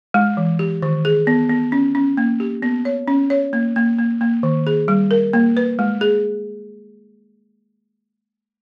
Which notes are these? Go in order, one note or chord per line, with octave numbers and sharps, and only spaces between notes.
G#3
E3
G4
D#3
G#4
B3
B3
C#4
C#4
A#3
G4
B3
C#5
C#4
C#5
A#3
A#3
A#3
A#3
D#3
G#4
G3
A#4
A#3
B4
G#3
G#4